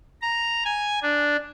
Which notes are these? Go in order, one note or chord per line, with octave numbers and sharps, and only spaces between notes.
A#5
G#5
D4